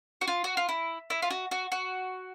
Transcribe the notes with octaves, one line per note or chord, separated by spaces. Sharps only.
F#4
F4
F#4
F4
E4
E4
F4
F#4
F#4
F#4